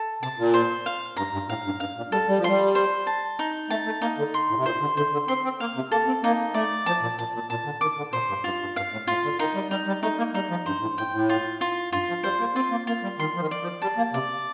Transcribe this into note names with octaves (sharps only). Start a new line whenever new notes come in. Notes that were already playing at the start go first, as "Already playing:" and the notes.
Already playing: A4
C3 A5
A#2
C5
F5
G2 A#5
G2
A2 F5
G2
G2 F5
A#2
G3 A4
G3
F3
G3 C6
C5
A5
D#4
A3 A5
A3
A#3 D#4
D3
C6
A2
C3
A#2 C5
D3
D3 C5
D3
C4 C6
C4
A#3 F5
C3
A#3 A4
C4
A#3 D#4
A3 D5
F3 A5
A#2
A#2 A5
A#2
A#2 A5
D3
D#3 D6
D3
A#2 C5
G2
G2 F4
G2
G2 F5
A2
A2 F4
D3
D#3 D#4
G3
G3 D#4
G3
A3 D#4
A#3
G3 D#4
F3
G2 C5
A2
A2 G5
A2
F4
F4
G2 F4
F3
G3 C5
A#3
C4 F4
A#3
A#3 F4
G3
D#3 C6
F3
D#3
D5
F3
G3 A5
A#3
C3 D5